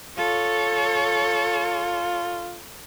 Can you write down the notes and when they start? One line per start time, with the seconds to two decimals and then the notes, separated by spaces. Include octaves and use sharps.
0.18 F4 A4 C#5